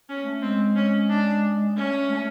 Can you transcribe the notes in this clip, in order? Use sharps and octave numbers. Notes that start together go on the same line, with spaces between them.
C#4
A3
G#3 C4
C#4
D4
A3 C#4
A3